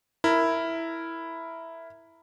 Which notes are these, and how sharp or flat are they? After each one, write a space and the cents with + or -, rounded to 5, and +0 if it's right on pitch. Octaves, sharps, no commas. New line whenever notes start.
E4 +0 A#4 -10